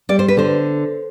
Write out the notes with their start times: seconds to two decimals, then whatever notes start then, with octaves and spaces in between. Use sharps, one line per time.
0.09 G3 D5
0.19 C5
0.28 B4
0.37 D3 C5